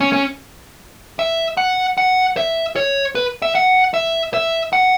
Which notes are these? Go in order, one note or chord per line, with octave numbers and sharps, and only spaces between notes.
C#4
C#4
E5
F#5
F#5
E5
C#5
B4
E5
F#5
E5
E5
F#5